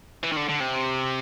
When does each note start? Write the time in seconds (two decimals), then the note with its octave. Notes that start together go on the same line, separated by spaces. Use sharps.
0.24 E3
0.32 D#3
0.37 D3
0.49 D3
0.60 C3